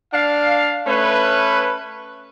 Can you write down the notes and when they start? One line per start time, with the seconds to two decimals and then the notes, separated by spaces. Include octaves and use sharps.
0.13 D4 F5
0.87 A3 C#4 B4